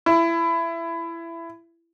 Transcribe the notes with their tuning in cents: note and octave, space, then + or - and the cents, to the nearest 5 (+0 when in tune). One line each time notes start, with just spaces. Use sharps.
E4 +20